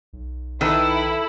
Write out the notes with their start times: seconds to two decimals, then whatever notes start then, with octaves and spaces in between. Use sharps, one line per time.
0.13 B1
0.61 D#3 E4 A4 B4